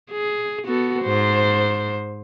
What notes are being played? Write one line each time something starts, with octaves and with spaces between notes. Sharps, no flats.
G#4
B3 F#4 A4
G#2 C5